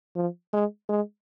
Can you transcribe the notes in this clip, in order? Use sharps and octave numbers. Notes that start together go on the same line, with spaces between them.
F3
G#3
G#3